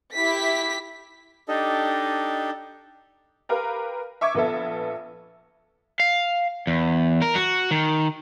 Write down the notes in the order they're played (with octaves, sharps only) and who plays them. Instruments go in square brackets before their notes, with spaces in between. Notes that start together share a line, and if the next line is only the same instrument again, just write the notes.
[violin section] E4 G4 B6
[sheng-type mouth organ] D4 D#4 G4 A4 D#5
[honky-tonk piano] G4 A#4 B4 F5
E5 C#6 D6 G#6
A#1 B3 A4 E5
[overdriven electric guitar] F5
E2
A#4
F#4
D#3